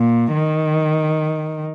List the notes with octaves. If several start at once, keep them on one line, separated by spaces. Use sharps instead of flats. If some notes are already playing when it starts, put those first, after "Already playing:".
Already playing: A#2
D#3